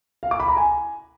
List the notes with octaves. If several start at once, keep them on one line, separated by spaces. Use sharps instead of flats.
F5
D6
B5
A#5
G#5